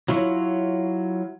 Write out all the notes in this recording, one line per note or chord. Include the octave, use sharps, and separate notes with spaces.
F#3 E4 F4 C#5